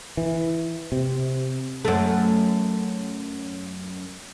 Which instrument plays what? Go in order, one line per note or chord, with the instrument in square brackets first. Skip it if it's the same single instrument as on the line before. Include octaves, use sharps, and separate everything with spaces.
[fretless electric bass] E3
C3
[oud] F#2 A3